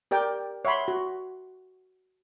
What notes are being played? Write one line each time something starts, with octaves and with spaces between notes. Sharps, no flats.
G4 A#4 D5 G5 D6
C#5 E5 F#5 B5 C6
F#4